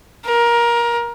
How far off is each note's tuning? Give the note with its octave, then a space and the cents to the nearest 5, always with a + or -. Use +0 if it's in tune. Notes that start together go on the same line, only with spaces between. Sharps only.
A#4 +20